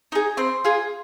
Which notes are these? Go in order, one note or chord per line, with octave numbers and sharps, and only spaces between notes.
D#4 G#4
C4 C6
F4 G#4